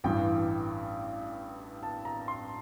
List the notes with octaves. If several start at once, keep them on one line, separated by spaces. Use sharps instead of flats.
A1 G2 E3 G5
A5
A#5
C6